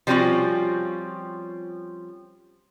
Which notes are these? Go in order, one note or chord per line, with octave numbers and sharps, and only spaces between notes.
F3 G3 C4 C#4 F4 F#4